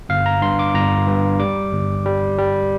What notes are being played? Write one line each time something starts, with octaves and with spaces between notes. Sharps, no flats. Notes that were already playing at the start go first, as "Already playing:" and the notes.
G1 F5
A#5
G2 C6
D6
G1 A#5
G2
G3 D6
G1
G3
G3